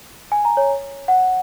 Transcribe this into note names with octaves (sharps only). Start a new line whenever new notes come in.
G#5
A#5
C#5
F#5